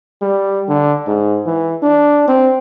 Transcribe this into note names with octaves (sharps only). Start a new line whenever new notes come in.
G3
D3
G#2
E3
D4
C4